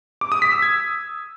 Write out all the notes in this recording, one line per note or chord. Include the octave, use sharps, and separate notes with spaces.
D6
D#6
B6
E6
G#6